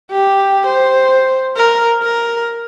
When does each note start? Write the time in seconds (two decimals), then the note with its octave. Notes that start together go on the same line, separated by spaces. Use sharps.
0.11 G4
0.67 C5
1.56 A#4
2.03 A#4